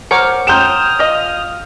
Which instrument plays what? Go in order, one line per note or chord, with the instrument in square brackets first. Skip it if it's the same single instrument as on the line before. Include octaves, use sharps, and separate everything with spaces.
[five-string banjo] A#4 C5 C#5 [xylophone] F#5 D6 F6
[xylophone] G5 A#5 C6 [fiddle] D#6 F6 [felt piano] G6 E7
[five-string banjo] F4 D#5